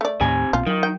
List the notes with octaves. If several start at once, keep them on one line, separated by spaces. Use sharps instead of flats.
A3 D5
D#2 A2 C3 G#5
B1 A#2 C4 F4
D#3 F#3
G5